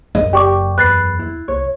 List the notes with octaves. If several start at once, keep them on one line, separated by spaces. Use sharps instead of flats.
A#1 F#2 D#5
F#1 G4 D5 C#6 D6
E2 B4 F#6 A6 C7
E4
C2 C#5